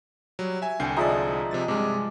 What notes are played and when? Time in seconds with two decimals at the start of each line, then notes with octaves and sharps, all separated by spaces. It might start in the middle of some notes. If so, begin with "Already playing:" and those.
0.39 F#3 G3
0.62 E5 G#5
0.80 C2 D3 G5 G#5 C7
0.97 F3 G#3 D#4 D5 E5 A#5
1.51 C3 F3 A6
1.68 G2 C3 G#3 G#4 D6